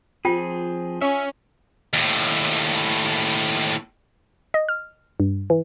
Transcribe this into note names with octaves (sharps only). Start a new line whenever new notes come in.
F3 C4 F4 G#4 G5
C#4 E5 C#6
D#2 A2
D#5
F6
G2
E3